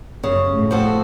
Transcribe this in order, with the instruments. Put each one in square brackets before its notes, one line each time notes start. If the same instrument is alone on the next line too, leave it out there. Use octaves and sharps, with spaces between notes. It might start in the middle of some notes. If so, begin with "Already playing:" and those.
[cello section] F#2 [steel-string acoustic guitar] C#3
[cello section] A2
[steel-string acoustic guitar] F3 C4 F#4 A4